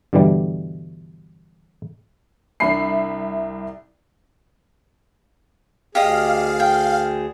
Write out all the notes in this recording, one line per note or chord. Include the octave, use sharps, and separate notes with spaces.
G2 B2 D3 E3 G3
C2 D4 E5 B5 C7
D2 G4 G#4 D#5 F5
G5